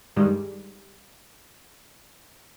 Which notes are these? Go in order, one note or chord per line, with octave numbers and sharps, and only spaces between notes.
G2 D#3 G3 G#3